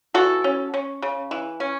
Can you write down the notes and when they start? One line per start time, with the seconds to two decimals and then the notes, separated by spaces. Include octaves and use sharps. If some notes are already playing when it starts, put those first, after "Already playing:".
0.14 E3 F#4 A4
0.44 C#4
0.74 C#4
1.02 C#3
1.31 E3
1.60 C#4